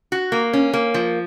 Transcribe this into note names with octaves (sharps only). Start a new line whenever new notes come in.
F#4
A#3
C#4
A#3
F3